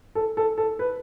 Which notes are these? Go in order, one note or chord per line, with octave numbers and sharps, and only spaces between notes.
A4
A4
A4
B4